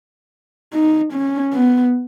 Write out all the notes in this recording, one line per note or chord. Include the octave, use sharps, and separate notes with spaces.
D#4
C#4
B3